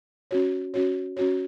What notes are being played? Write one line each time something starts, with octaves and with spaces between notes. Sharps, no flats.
C#4 F#4 C#5
C#4 F#4 C#5
C#4 F#4 C#5